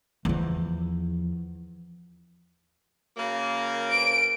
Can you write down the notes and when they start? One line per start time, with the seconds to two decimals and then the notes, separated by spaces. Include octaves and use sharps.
0.25 E2 F3
3.17 C#3 F#3 A#3
3.91 D7